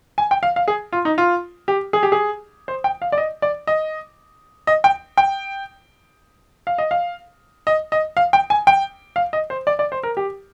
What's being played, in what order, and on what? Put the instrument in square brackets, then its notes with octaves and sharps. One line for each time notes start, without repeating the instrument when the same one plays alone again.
[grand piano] G#5
G5
F5
F5
G#4
F4
D#4
F4
G4
G#4
G4
G#4
C5
G5
F5
D5
D#5
D5
D#5
D#5
G5
G5
F5
D#5
F5
D#5
D#5
F5
G5
G#5
G5
F5
D#5
C5
D5
D5
C5
A#4
G4